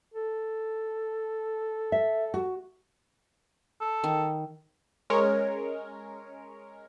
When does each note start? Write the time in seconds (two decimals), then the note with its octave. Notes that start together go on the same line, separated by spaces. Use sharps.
0.14 A4
1.92 E5
2.34 F#4
3.81 A4
4.04 D#3
5.10 G#3 C#4 A#4 C#5